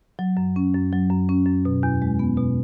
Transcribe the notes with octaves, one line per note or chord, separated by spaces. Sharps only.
F#3
F#2
C#4
F#2
F#3
F#2
C#4
F#2
B2
E2
G#3
B3
B2